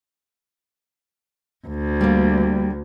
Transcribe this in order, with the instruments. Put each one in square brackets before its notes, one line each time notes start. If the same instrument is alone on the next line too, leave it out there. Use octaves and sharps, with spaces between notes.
[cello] D2
[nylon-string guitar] G3 A#3